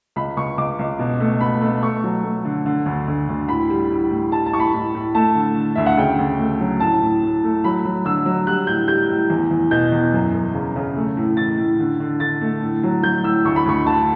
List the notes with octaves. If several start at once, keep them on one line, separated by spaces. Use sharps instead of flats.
C#2 B5
C#2 C#6
C#2 D6
C#2
B2
A3
B2 B5
A3
A3 C#6
F#3
A3
D3
D3
D2
D2
D2
A2 B5
G3
A2
A2
G3 A5
A5
A2 C#6
B5
A2
A2
A3 A5
D3
D3
D2 E5
F#5
C#3 G5
D2
A3
F#3
A2 A5
A2
A2
A3
F#3 B5
F#3
D3 E6
F#3
G3 F#6
A2 G6
G3 G6
A2
E2
E2
B2 G6
E2
F#2
F#2
C#3
C#3
A3
A2
E3 A6
A2
D3
D3
D3 A6
A3
A2
F#3
F#3 G6
A2 E6
D2 C#6
B5
D2 C#6
D3 A5